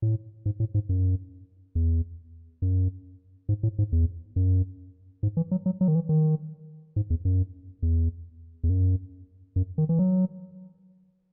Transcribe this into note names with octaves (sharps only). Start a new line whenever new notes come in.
A2
G#2
A2
G#2
F#2
E2
F#2
G#2
A2
G#2
E2
F#2
G#2
E3
F#3
F#3
F#3
D#3
E3
D#3
G#2
E2
F#2
E2
E2
F#2
F#2
D#3
E3
F#3